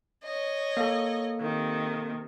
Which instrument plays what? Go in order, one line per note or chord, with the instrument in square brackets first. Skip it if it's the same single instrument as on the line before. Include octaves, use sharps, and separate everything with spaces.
[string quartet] C#5 D#5
[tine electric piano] A#3 A4
[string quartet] C3 D#3